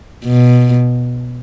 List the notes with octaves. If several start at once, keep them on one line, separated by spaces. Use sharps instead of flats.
B2